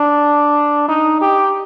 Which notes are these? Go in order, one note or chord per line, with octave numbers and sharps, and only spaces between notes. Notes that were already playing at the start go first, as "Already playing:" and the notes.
Already playing: D4
D#4
G4